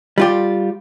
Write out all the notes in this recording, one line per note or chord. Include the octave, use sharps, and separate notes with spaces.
G3 F4 G4